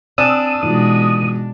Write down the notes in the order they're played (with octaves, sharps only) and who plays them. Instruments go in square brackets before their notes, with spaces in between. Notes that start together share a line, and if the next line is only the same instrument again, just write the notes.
[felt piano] C4 G#5 A6 [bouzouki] D4 [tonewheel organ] D#6 E6
[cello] B2 G#3 [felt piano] E3 D#4 F4 [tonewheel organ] D#6